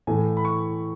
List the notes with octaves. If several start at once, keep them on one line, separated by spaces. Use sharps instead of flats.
A2 E3 A3 G#5
B5
C#6